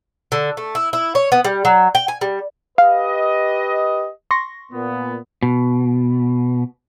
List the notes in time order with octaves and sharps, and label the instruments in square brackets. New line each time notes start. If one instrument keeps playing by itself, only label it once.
[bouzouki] D3
A3
E4
E4
C#5
B3
G3
F#3
G5
G#5
G3
[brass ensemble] G4 B4 D#5 [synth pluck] F5
[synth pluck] C6 C#6 A#6
[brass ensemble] A#2 B3
[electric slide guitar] B2